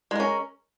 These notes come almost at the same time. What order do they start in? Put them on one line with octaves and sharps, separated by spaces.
G#3 A#4 C#4